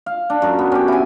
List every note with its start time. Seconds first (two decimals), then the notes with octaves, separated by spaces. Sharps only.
0.06 F5
0.30 D4
0.42 F#2 A#5
0.59 B3
0.72 C#4 G4
0.88 E4 G#5